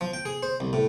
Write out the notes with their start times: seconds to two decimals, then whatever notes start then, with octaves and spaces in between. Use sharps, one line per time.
0.01 F3
0.13 G5
0.25 G#4
0.43 C5
0.60 C2
0.73 A2